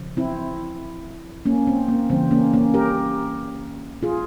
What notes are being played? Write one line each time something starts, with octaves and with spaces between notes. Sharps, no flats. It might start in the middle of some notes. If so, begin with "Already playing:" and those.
Already playing: C#3 F3
C4 E4
A#3 C#4
C4
A#3
C#3 E3 G3 C4
A#3 C#4
A#3 C#4
G4 A#4
F4 G#4